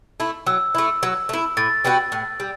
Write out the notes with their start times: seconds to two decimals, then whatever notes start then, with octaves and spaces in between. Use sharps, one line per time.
0.20 A3 E4
0.47 F#3 E6
0.75 A3 E4
1.03 F#3
1.29 A3 E4
1.57 A2 A6
1.85 G3 B3 F#4
2.12 A2
2.40 G3